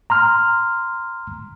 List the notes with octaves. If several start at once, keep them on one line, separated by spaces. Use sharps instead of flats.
A#5 C6 F6